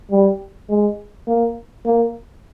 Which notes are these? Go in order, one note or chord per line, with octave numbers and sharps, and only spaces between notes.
G3
G#3
A#3
A#3